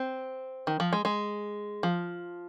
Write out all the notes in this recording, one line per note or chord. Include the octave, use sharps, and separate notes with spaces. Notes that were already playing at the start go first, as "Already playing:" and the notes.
Already playing: C4
D#3
F3
G#3
G#3
F3